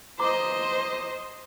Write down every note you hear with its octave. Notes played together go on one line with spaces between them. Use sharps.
C5 D#5 A#5 C6 D6